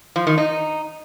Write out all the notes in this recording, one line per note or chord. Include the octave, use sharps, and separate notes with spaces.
F3
D#3
D#4